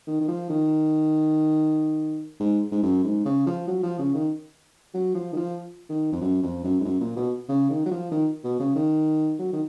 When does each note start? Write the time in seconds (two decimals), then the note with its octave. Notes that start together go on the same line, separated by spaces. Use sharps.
0.07 D#3
0.21 D#3
0.28 F3
0.50 D#3
2.40 G#2
2.72 G#2
2.82 F#2
3.04 G#2
3.25 C#3
3.47 F3
3.68 F#3
3.83 F3
3.99 C#3
4.14 D#3
4.94 F#3
5.15 F3
5.33 D#3
5.36 F3
5.89 D#3
6.12 F2
6.21 F#2
6.43 F2
6.64 F#2
6.80 G#2
6.85 F#2
7.00 A#2
7.17 B2
7.49 C#3
7.70 D#3
7.86 F#3
7.91 F3
8.12 D#3
8.44 B2
8.60 C#3
8.76 D#3
9.39 F#3
9.53 D#3